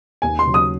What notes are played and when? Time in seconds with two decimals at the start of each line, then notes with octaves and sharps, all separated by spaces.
0.22 D#2 G#5
0.39 C6
0.47 C#3 F#3
0.54 D#6